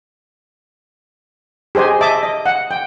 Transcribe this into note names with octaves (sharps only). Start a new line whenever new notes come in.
G4 G#4 C5 D#5 G#5
D#5 E5 A5 D6
D#5
F#5
G5